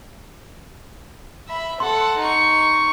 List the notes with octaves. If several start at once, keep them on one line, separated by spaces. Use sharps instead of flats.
E5 B5
A4 F#5 C6
D#4 C#6